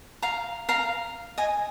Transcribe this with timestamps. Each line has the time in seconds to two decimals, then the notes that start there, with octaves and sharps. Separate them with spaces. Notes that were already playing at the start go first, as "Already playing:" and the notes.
0.22 F5 A#5
0.69 F5 A#5
1.38 D#5 G#5